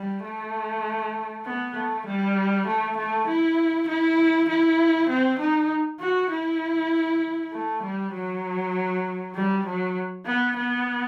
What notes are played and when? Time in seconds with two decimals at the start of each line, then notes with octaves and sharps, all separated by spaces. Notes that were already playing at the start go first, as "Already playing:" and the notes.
Already playing: G3
0.24 A3
1.45 B3
1.75 A3
2.06 G3
2.66 A3
2.97 A3
3.28 E4
3.88 E4
4.49 E4
5.09 C4
5.39 D#4
6.00 F#4
6.30 E4
7.53 A3
7.83 G3
8.13 F#3
9.35 G3
9.66 F#3
10.26 B3
10.57 B3